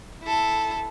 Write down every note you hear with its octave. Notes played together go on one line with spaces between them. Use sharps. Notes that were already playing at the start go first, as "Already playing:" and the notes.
E4 A4